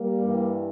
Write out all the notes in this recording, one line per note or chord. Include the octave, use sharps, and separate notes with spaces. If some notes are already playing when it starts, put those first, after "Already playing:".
Already playing: G3 A#3
G2 E3